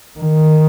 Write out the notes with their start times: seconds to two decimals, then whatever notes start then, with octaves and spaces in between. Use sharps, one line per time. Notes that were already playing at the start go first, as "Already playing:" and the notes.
0.20 D#3